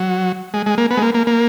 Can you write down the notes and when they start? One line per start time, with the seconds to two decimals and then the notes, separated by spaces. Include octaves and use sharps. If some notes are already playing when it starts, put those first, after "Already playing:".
Already playing: F#3
0.54 G#3
0.66 G#3
0.78 A#3
0.91 B3
0.97 G#3
1.02 A#3
1.14 A#3
1.27 A#3